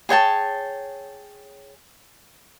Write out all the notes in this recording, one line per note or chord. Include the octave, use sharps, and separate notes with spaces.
G#4 C#5 G5 A5